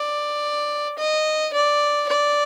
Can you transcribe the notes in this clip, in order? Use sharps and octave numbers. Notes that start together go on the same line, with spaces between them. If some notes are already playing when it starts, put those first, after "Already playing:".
Already playing: D5
D#5
D5
D5